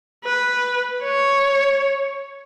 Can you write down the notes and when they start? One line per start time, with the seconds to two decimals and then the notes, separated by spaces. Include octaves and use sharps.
0.24 B4
1.03 C#5